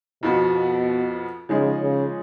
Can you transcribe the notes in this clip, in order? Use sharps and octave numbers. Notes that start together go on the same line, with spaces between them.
F2 B2 F3 B3 F#4
C#3 F3 G#3 D#4 G#4
C#3